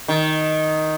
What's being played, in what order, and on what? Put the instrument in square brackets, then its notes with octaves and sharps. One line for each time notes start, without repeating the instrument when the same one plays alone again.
[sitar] D#3